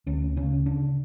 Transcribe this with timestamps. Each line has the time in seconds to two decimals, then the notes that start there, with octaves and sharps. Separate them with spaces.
0.06 D2 C#4
0.37 C#3 C#4
0.66 C#3 D4